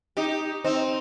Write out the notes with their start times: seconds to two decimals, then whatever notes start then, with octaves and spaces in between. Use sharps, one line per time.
0.17 D#4 G4
0.64 C4 D#4